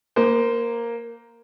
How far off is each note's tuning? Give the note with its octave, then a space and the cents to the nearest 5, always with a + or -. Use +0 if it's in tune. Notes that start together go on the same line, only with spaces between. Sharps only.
A#3 +0 C5 -20